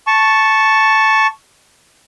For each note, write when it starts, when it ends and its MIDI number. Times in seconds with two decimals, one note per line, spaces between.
0.07 1.27 81
0.07 1.27 85